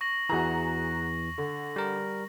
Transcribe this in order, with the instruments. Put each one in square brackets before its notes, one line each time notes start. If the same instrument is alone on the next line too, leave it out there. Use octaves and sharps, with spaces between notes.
[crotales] C#6 A#6 F#7
[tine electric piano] E2 E3 [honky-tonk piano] F#4 G#4 A#5
[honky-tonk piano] D3
[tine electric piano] G3 A#4